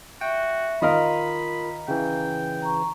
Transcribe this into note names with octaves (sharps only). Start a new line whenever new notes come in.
F#4 E5 G5
D#3 F4 A#4 D#5 F5 A#5 B5
C#3 E3 G5
A#5 C#6